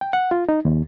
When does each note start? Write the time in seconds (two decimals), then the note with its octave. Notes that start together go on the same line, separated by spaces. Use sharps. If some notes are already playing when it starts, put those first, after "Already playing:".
0.01 G5
0.13 F#5
0.31 F4
0.49 D#4
0.65 D#2